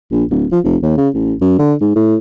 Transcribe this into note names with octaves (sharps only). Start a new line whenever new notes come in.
A#1
D1
F3
F1
D#2
C#3
A1
F#2
D3
G#2
A2